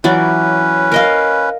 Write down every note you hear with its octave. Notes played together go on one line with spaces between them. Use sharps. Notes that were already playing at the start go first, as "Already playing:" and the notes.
E3 F#3 C#4 B4 D5
A#4 D#5 F5